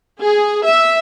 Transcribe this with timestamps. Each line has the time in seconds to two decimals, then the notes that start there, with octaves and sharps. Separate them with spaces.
0.20 G#4
0.66 E5